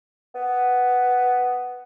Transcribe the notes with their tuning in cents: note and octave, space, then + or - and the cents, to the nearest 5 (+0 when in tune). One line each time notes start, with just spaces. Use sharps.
B3 +5